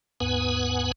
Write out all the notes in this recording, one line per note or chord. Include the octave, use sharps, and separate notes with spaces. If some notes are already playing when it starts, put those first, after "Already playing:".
D#2 G#2 B3 B4 F#5 G#5